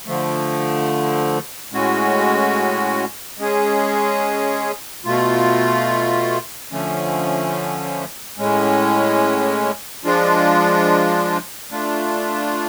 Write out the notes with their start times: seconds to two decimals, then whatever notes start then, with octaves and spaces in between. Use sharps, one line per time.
0.06 D3 F3 A3
1.72 A2 G#3 C#4 F#4
3.38 G#3 C#4 G#4
5.05 B2 A3 F4
6.71 D3 F3 A3 C#4
8.38 A2 G#3 C#4
10.04 F3 G#3 D4 F4
11.71 A3 D4 F4